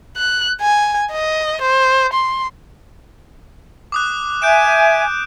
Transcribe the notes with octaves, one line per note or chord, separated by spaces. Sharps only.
F#6
G#5
D#5
C5
C6
D6 D#6 F#6
E5 G#5 G6 D7 E7